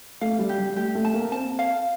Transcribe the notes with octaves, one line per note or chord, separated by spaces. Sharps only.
A3 F5
G3
G4
G3
A3 G4
A3
A5
A#3
C4 A5
F5